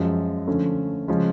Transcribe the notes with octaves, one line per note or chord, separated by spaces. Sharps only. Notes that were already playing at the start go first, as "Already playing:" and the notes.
Already playing: F#2 F3 G#3
D3 F3 A3 C#4
C#3 F3 G#3 C#4